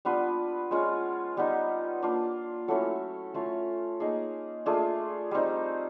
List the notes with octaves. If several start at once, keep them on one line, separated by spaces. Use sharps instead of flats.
G3 B3 D4 F4 B4
G#3 C#4 F4
G3 B3 D#4
A#3 D4 F4
F#3 A3 C#4 E4 A4
A3 C#4 F4
A#3 D#4 G#4
A3 D4 F4 G#4
G3 C4 D#4